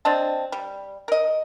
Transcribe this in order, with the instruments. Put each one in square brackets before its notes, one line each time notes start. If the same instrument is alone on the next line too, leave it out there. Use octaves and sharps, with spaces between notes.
[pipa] C4 D4 D#5 A5
G3
A#4 D#5